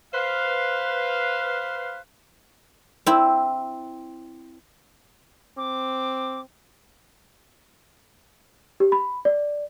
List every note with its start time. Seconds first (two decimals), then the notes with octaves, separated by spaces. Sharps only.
0.14 B4 C5 F5
3.07 C4 E4
5.57 C4 D6
8.80 G4
8.92 B5
9.25 D5